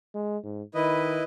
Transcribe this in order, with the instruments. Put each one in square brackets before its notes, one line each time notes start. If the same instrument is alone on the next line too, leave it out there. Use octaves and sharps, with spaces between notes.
[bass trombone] G#3
G#2
[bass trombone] D#3 [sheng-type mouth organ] E4 B4 D#5